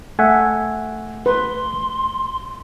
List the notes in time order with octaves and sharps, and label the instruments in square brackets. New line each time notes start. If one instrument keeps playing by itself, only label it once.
[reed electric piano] A3 [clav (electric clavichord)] E5 F#5 G#5
[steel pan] B4 [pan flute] C6